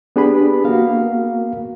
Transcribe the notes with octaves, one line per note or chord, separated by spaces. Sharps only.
B3 D4 G4 G#4 B4 B5
A#3 B3 F#4 A#4 F5